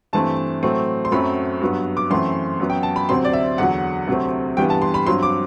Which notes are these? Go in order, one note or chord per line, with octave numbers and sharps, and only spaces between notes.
G2 E3 A3 C4 A5
A2 F#3 A3 C4
C6
F#2 F#3 A3 C4 B5
G2 F#3 B3
D6
F#2 E3 A3 C4 C6
F#2 F#3 B3
G5
A5
B5
D2 C3 F#3 C4 C6
D5
E5
E2 D3 F#3 F#5
D2 C3 F#3 A3 C4
G2 E3 G3 B3 G5
A5
C6
B5
G2 F#3 C4 C6
D6